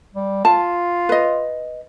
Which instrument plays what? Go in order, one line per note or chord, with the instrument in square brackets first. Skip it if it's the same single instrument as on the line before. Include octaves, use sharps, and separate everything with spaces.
[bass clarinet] G3
[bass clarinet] F4 [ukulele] A5
[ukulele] B4 D#5